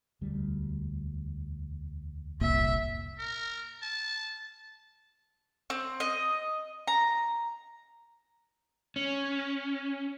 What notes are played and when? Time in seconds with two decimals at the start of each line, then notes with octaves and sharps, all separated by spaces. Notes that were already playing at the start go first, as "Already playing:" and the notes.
0.21 E1 D2 G3
2.41 F1 C2 A#2 E5
3.18 A#4
3.82 A5
5.70 C4
6.00 D#5
6.87 A#5
8.96 C#4